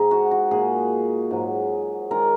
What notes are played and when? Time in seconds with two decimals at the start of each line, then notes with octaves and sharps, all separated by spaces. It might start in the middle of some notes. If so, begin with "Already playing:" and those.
Already playing: G#2 D#4 G#4
0.11 F#4
0.31 F#4
0.51 A#2 G#3 G#4
1.31 G#2 F#3
2.11 D#3 G#3 A#4